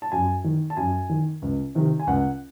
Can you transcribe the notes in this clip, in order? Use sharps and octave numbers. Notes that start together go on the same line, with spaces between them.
A5
F#2 G#5
D#3
A5
F#2 G#5
D#3
C#2
C3 D#3
G#5
C#2 F#5